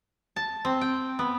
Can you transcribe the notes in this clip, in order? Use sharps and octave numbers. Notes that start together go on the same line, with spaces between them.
A5
C4
G5
B3